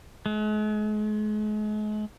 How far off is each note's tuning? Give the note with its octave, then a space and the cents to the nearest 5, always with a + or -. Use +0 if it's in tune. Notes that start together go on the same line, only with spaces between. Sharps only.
G#3 +40